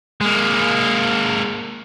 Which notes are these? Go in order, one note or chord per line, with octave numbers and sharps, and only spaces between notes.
G#3 A#3